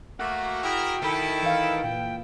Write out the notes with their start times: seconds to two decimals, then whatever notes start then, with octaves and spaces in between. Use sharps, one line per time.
0.20 A3 A#3 F#4
0.63 E4 G#4 A#4 G5
1.02 D#3 E4 A4
1.43 E3 F5
1.83 A#2 G5